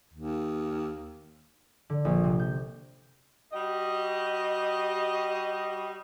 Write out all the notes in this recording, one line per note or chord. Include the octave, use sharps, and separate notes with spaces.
D#2
D3
A#1
C3
G6
G3 F#4 G4 D#5